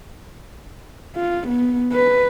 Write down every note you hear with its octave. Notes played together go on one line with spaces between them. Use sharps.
F4
B3
B4